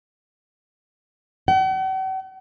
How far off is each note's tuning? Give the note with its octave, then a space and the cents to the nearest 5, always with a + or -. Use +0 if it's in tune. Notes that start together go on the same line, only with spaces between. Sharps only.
F#5 +45